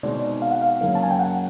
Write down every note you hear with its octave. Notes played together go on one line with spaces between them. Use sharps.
B2 G#3 C4 D#4 D5
F5
F#5
F5
F#2 C#3 F#3 A#3 C#4
A5
G#5
G5
F#5